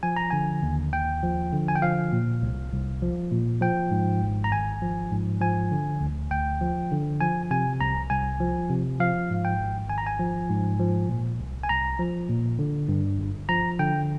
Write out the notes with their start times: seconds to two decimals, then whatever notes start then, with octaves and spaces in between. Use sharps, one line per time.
0.03 F3 G#5
0.16 A#5
0.30 D3 G#5
0.63 D#2
0.92 D#2 G5
1.23 F3
1.52 D3
1.68 G#5
1.75 G5
1.82 F3 F5
2.12 A#2
2.42 C2
2.72 C2
3.02 F3
3.31 A#2
3.61 F3 G5
3.91 G#2
4.22 G#1
4.44 A#5
4.51 G#1 G#5
4.82 F3
5.11 G#2
5.41 F3 G#5
5.72 D3
6.01 D2
6.31 D2 G5
6.61 F3
6.91 D3
7.21 F3 G#5
7.51 C3 G#5
7.81 C2 A#5
8.10 C2 G#5
8.40 F3
8.70 C3
9.00 F3 F5
9.30 G#2
9.45 G5
9.60 G#1
9.90 G#1 G#5
9.98 A#5
10.07 G#5
10.19 F3
10.50 G#2
10.79 F3
11.09 A#2
11.40 C2
11.63 G#5
11.69 C2 A#5
11.99 F3
12.29 A#2
12.59 D3
12.88 G2
13.19 G1
13.49 F3 A#5
13.79 D3 G5